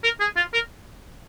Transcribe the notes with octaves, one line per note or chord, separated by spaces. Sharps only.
A#4
G#4
F4
A#4